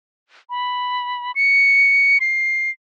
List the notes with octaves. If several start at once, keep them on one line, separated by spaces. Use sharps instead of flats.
B5
C#7
C7